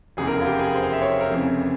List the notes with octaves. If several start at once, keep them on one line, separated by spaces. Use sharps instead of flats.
F1 E2 C#3 E3 G#4
A#4
F4
G4
G#4
C5
F5
E5
C#5
C5
A#4
F1 F2 C#3 E3